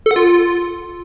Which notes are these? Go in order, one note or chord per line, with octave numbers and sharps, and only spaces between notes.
A4
F#5
F4